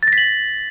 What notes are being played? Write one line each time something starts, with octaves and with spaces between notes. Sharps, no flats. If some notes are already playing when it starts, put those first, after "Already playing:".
A6
A#6
B6
F#7